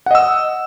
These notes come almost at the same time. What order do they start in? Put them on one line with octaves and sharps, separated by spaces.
F#5 D#5 E6